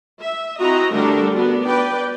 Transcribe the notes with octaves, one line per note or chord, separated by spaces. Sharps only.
E5
C4 E4 F#4 D#5 A#5
D3 G3 A3 D4 A4 A#4
B3 D4 F#4
B4 D5 G5